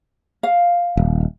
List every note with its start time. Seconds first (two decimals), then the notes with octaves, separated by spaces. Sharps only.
0.43 F5
0.97 D#1